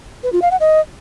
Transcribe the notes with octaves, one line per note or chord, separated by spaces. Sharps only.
B4
F4
F5
F#5
D#5